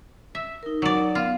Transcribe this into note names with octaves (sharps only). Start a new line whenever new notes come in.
E5
D#4 A#4
F#3 D5
B3 F4 F5